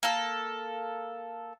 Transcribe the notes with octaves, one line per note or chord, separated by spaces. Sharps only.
A#3 A4